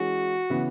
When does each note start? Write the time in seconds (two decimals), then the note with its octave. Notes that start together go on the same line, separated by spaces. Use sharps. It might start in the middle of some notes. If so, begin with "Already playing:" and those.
Already playing: E3 G#3 C#4 F#4 G#4
0.50 C#3 E3 B3